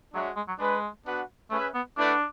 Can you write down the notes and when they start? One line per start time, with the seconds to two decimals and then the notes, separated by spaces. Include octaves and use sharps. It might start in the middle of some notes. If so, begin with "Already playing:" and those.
0.13 F#3 G#3 D4 F#4 C#5 E5
0.36 G#3
0.48 F#3
0.59 G#3 D4 G#4 B4
1.05 B3 D4 F#4 B4 F#5
1.50 A3 C#4 G#4 B4 E5
1.74 B3
1.97 A3 D4 E4 B4 D5 F#5